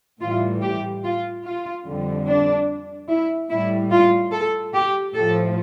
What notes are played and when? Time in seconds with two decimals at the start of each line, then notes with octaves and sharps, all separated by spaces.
0.21 A2 E3 G3 F4
0.62 G4
1.04 F4
1.44 F4
1.86 F2 D3 G3
2.27 D4
3.09 E4
3.50 A2 G3 E4
3.91 F4
4.32 A4
4.74 G4
5.14 A2 F3 A4